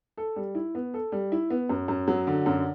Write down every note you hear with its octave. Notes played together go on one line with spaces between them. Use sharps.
A4
G3
E4
B3
A4
G3
E4
B3
F#2
F#2
F#3
D3
F#2